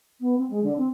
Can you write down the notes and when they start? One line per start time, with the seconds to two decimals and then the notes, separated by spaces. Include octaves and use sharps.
0.20 B3
0.37 C4
0.50 G#3
0.63 D3
0.77 C4